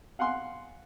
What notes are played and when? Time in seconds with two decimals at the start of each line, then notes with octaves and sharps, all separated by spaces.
0.19 F5 F#5 G#5 C6